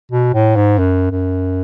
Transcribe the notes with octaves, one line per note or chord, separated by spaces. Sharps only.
B2
A2
G#2
F#2
F#2